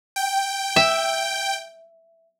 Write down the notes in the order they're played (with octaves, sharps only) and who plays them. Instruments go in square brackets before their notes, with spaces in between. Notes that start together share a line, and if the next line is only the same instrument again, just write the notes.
[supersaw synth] G5
[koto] E5